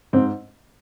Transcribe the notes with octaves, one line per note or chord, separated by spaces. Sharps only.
G#2 C4